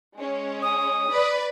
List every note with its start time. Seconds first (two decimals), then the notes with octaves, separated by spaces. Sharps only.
0.16 G#3 C#4
0.62 D#6
1.10 B4 D5